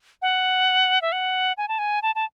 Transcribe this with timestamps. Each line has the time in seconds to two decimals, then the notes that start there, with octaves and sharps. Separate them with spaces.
0.22 F#5
1.02 E5
1.12 F#5
1.58 G#5
1.68 A5
1.79 G#5
2.02 A5
2.15 A5